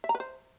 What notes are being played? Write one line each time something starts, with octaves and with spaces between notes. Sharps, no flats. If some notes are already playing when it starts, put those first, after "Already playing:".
E5
A#5
B4
C5